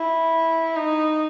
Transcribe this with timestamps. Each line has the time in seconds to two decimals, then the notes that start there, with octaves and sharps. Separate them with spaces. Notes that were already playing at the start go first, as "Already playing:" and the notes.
Already playing: E4
0.76 D#4